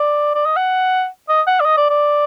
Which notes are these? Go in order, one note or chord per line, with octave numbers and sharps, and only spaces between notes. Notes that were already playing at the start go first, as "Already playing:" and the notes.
Already playing: D5
D5
D#5
F#5
D#5
F#5
D5
D#5
D5
D5